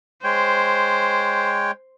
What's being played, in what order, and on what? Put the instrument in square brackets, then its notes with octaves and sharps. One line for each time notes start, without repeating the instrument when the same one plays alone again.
[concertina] G#3 C#5 G5 [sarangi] C5